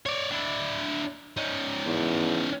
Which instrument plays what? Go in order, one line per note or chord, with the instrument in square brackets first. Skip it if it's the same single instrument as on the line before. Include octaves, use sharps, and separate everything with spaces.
[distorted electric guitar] C#5 D5
D4 E4
C#4 D#4
[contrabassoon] E2